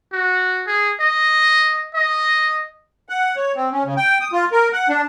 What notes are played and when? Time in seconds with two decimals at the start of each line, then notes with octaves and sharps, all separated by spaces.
0.12 F#4
0.67 G#4
1.00 D#5
1.95 D#5
3.09 F#5
3.36 C#5
3.56 C4
3.72 C#4
3.85 C#3
3.97 G5
4.21 D#6
4.33 F4
4.52 A#4
4.73 F#5
4.89 D4